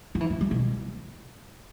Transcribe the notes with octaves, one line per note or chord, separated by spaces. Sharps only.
F3
E3
F3
G3
B2